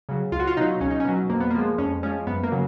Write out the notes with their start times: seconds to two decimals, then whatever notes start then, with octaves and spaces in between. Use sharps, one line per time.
0.09 C#3 F#3
0.32 C#2 F4
0.40 F#4
0.47 F4
0.57 B2 F#3 D#4
0.81 C#2 C#4
0.91 D#4
1.00 C#4
1.05 B2 F#3
1.30 F2 A#3
1.40 B3
1.50 A#3
1.55 F3 G#3
1.78 F2 C#4
2.03 F3 G#3 C#4
2.27 F#2 B3
2.43 A#3
2.52 C#3 F#3